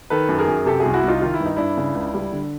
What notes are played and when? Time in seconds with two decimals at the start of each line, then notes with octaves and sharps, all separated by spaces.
0.10 D#3 A4 B4
0.29 F#2
0.39 G#4 A#4
0.48 F#2
0.66 C3 G4 A4
0.80 F#4 G#4
0.85 C2
0.94 E4 F#4
1.04 C2 D#4 F4
1.22 D#3 F4
1.34 E4
1.40 G2
1.46 D#4
1.57 G2 D4 E4
1.77 C#3
1.95 C#2
2.14 G3
2.32 D3